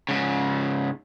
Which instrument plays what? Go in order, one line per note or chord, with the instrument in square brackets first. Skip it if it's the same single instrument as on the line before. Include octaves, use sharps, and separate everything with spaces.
[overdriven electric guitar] G#2 C#3